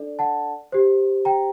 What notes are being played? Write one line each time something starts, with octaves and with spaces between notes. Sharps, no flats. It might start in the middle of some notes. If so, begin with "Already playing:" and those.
Already playing: D4 A4 D5
F#5 A5
G4 C5
G5 A#5